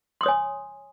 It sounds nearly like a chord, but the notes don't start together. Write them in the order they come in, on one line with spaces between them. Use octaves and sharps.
C6 D#6 C#5 G#5